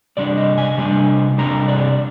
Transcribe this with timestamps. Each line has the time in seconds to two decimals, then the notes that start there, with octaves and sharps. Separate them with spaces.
0.17 C3 G3 D4 D5
0.37 D#5
0.58 G#5
0.77 C3 G3 D4
1.38 C3 G3 D4 A#5
1.68 D5